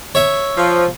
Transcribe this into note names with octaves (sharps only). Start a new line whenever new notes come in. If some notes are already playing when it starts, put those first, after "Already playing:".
C#5 E5
F3